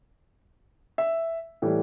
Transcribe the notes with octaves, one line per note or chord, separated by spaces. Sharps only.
E5
A2 E3 G3